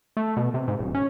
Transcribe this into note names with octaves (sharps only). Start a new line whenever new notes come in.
A3
B2
C3
G#2
D#1
C#4